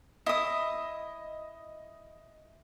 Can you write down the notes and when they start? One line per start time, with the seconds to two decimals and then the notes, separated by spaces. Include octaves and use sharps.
0.26 E4 D#5 D#6